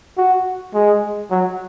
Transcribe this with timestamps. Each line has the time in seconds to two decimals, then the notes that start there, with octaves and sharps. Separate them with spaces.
0.17 F#4
0.74 G#3
1.31 F#3